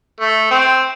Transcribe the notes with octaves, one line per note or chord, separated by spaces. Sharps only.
A3
C4